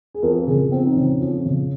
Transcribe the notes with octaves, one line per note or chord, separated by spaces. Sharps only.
G#4
F2 A#4
C#3 G#4
F2 C4
D#4
C#3 C#4
F2
C#3